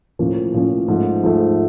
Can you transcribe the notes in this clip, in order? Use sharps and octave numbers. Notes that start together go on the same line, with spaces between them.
A2 F3 A#3 C#4
A2 F3 A#3 C#4
G#2 F3 A3
G#2 F3 A3